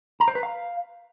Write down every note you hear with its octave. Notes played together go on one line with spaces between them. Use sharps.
A#5
C5
B4
F5